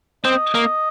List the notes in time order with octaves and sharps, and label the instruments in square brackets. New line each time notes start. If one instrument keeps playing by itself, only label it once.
[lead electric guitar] C4 [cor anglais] D#5
[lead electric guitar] A#3